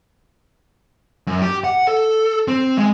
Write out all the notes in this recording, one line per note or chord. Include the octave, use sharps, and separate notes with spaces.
F#2
G4
F#5
A4
C4
G#3